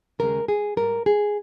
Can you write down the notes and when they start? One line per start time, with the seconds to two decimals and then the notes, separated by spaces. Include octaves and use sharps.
0.19 D#2 C#3 G#3 A#4
0.48 G#4
0.77 G#2 G3 A#4
1.06 G#4